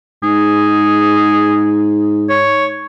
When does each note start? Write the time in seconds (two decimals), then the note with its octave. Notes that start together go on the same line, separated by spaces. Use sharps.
0.23 G#2 G#4
2.30 C#5